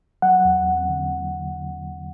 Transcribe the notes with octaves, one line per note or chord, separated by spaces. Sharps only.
F#3 F#5
E2
E2
D3